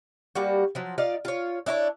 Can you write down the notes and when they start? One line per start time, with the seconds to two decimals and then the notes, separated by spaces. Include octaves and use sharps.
0.35 G3 A#3 F#4
0.75 F3 F#3
0.98 D#4 F4 D5 F5
1.25 F4 C#5
1.66 D4 E4 A#4 C#5